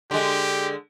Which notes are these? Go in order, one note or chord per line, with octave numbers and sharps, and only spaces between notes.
D3 G#3 G4